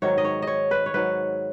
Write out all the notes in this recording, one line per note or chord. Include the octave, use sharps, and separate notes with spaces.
G#2 D#3 F#3 C#5
D#5
C#5
C#5 D#5
B4
C#5
G#2 F#3 B4